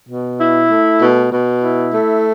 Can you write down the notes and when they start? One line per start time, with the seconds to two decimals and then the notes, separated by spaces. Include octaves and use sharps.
0.09 B2
0.39 E4
0.70 A3
1.00 B2
1.30 B2
1.61 E4
1.91 A3